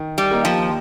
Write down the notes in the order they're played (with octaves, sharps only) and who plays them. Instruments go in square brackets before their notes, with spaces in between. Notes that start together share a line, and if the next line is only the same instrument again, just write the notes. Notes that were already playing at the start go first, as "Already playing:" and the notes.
Already playing: [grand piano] D#3
[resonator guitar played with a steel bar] G3
[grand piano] A#3 D#4 G4 A#4
[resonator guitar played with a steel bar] F3